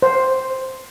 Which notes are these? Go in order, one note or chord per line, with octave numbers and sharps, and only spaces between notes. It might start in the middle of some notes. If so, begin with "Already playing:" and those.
C5